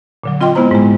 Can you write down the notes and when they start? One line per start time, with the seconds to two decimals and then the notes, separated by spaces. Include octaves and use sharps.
0.24 A#2 D3 F#3
0.41 C4 F4 D#5 G5 C6
0.55 G#3 B3 E4 C5 A#5
0.71 G#2 G#3